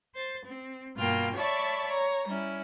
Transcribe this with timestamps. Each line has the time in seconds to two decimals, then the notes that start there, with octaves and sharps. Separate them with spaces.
0.14 C5 A6
0.45 C4
0.97 G2 B2 A#3 F4 G5 F6
1.35 C#5 D5 E5 A5 B5 C#6
1.88 C#5 A#5
2.27 G3 C#4 E4